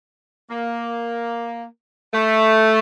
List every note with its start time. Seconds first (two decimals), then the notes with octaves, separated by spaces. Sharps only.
0.50 A#3
2.13 A3